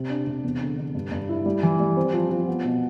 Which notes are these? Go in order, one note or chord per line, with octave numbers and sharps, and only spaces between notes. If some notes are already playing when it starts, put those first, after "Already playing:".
Already playing: C3
D4
C3
E2
D3
D3
G2
G2
E4
G3
E3
G3
C4
F3
F3
B3
B2